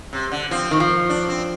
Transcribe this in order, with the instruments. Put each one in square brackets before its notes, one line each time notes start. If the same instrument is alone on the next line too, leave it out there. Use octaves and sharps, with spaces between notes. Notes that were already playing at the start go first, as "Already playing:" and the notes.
[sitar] C3
D3
[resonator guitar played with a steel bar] F3 [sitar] C4
[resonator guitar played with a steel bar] D#3
F3
[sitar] D4
C4